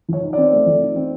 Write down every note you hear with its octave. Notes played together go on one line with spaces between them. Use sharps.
F3 C#5
D#4
C4 D5
A3
F3
D#4
C4